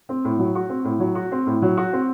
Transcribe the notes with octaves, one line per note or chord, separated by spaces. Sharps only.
C4
A2
F#3
F#4
C4
A2
F#3
F#4
C4
A2
F#3
F#4
C4